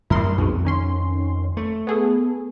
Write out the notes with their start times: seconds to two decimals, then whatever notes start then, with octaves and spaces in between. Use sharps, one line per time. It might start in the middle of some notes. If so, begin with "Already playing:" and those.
0.10 F#2 A2 G3 E4 A#4 C6
0.38 B1 F2 G#2 B2
0.65 D#3 C#4 C6
1.57 A3
1.87 B3 G#4 A4